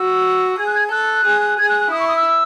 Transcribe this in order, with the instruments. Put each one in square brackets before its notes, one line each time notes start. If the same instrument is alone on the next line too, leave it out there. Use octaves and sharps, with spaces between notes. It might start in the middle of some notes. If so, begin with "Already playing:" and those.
Already playing: [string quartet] F#4 [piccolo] E6
[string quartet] G#4 [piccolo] G#6
[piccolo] F#6
G#6
[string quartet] A4 [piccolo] F#6
[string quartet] G#4
[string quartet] G#4 [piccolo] G#6
[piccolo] F#6
F#6
[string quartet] E4 [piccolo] D#6
[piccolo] C#6
D#6
E6